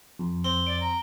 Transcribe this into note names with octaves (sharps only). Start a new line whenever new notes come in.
F2
C4 G7
D5 D7
A#5